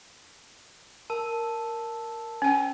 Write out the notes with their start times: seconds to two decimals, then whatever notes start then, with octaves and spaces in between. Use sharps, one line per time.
1.10 A#4 A5 E6
2.42 C#4 G5